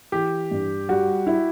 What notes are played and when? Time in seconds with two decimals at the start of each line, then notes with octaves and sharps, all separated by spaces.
0.12 E3 G4
0.51 G2
0.89 G3 F#4
1.27 E4